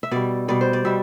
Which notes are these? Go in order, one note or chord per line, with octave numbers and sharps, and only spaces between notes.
E5
B2 G3 D5
B2 G3 D5
C5
D5
B2 G3 E5